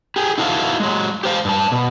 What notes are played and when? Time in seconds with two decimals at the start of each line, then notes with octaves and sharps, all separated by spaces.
0.16 G4 G#4
0.38 D#4 E4 F#4 A4 A#4 F5
0.80 F#3 G#3
1.24 G4 C5 F5
1.45 G2 A5
1.72 B2